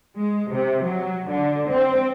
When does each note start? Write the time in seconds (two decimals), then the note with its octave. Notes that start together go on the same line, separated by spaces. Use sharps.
0.18 G#3
0.51 C3
0.84 F#3
1.30 D3
1.70 C4